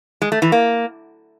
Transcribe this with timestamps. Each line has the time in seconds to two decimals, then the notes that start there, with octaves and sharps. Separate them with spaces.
0.22 G#3
0.32 A3
0.42 E3
0.52 A#3